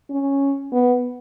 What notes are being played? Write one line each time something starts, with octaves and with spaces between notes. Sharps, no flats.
C#4
B3